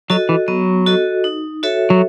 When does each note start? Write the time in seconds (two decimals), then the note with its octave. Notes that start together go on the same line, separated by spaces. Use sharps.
0.10 F#3 F#4 A4 D#5
0.29 E3
0.48 F#3 B3
0.86 F#4 A4 D#5
1.24 D#4
1.63 F#4 A4 C#5 E5
1.90 F#3